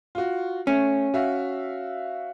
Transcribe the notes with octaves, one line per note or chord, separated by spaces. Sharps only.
F4 F#4
A3 C#4
F#4 E5 F5